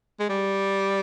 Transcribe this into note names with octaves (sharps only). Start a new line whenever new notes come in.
G#3
G3